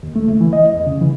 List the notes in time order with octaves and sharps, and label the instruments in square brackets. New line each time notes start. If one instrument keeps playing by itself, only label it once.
[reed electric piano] D#2
A3
C#2
E3
D#5
E2
C#3
E3